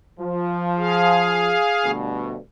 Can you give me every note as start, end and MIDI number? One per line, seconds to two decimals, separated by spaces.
0.20 1.57 53
0.77 1.91 68
0.77 1.91 77
1.85 2.37 38
1.85 2.37 43
1.85 2.37 47